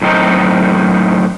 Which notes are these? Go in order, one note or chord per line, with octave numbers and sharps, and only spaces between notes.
F#2 A2 D#3 C4 D#4 A#4